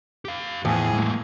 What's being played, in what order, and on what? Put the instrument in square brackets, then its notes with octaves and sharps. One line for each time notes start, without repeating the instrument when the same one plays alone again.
[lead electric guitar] G4 F5
[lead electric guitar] E2 [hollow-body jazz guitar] A2 [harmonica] E3 F3 G#4
[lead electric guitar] G#3 A#3